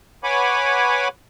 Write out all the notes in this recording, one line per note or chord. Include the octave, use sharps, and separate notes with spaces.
B4 C#5 F#5 G#5 B5 D6